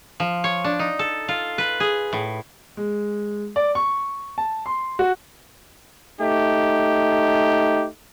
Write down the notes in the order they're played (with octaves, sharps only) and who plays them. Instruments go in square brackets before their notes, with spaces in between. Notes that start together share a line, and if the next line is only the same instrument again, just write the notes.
[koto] F3
C#5
D4
D#4
A4
F4
B4
G#4
A2
[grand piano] G#3
D5
C#6
A5
C6
F#4
[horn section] A3 D#4 G4